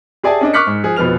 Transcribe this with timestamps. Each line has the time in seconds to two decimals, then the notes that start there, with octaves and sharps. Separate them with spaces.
0.23 G4 G#4 D5 E5 G#5 A5
0.41 C#4 D4 D#5
0.53 C#6 D6 F6 F#6 B6 C#7
0.67 G#2
0.84 F3 G#4
0.96 F1 B2 F3 B4 F6 F7